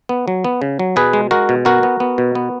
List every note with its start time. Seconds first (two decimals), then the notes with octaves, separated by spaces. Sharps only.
0.09 B3
0.28 F#3
0.44 B3
0.62 C#3
0.79 F#3
0.96 B2 G#4 B4
1.13 G#3
1.31 G#3 F#4 A#4
1.49 B2
1.65 B3 F#4 A#4
1.83 B3
2.00 B3
2.18 B2
2.35 B3